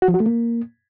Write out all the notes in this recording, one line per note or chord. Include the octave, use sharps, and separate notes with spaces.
F#4
F3
F#4
A3
A#3